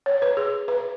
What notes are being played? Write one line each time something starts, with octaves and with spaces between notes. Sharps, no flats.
C#5
B4
G#4
B4